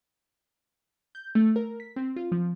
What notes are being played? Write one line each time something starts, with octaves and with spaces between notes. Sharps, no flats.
G6
A3
A#4
B6
C4
F4
F3